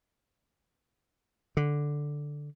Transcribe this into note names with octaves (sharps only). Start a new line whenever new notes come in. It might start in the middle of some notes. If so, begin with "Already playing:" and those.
D3